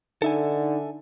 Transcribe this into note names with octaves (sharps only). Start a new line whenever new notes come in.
D3 D#4 A4 E5 G#5